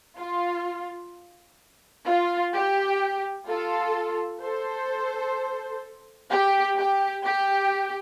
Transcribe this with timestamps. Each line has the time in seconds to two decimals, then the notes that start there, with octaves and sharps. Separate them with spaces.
0.18 F4
2.07 F4
2.54 G4
3.47 F4 A4
4.42 A4 C5
6.31 G4
6.77 G4
7.25 G4